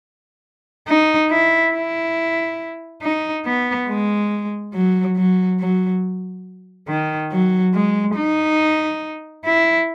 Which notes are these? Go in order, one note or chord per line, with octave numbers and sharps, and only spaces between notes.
D#4
E4
E4
D#4
B3
G#3
F#3
F#3
F#3
D#3
F#3
G#3
D#4
E4